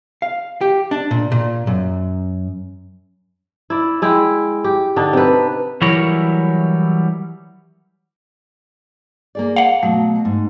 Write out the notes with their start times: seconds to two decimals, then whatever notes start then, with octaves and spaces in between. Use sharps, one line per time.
0.22 F5
0.61 G4
0.91 D4
1.11 A#2
1.32 A#2
1.67 F#2
3.70 E4 D5
4.02 G#3 E4 G5
4.64 G4
4.96 D3 D4 D#4
5.13 C3 B4
5.81 E3 F#3 G3 E4 A#4 C#5
9.35 A#3 G#4 D5
9.56 F5 F#5
9.83 B2 F#3 A3
10.25 G#2